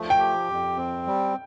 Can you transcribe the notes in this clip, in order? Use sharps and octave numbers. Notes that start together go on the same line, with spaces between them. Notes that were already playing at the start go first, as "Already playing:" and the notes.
Already playing: F3 A3
G5
G4
F2
C4
G3